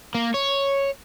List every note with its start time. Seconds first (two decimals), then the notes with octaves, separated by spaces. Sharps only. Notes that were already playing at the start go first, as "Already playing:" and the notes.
0.14 A#3
0.34 C#5